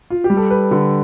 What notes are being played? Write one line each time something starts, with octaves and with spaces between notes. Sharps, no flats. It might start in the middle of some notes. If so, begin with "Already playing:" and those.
F4
G4
G3
A4
B4
D3 B4